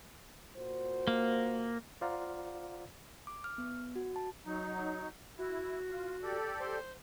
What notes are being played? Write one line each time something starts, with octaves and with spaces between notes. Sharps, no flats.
A#2 F#4 C5
A#3
F4 C5 D5 F5 F#5 A#5
D6
F6
B3
F#4
A5
F#3 D#4
E4 F#4
F4
G4 A4 D5
C5